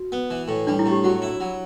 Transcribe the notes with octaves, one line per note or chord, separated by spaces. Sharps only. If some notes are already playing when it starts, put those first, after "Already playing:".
Already playing: F#4
B3
E3
A2
G3 D4
E4
A2
G4
F#3 F#4
E4
F#3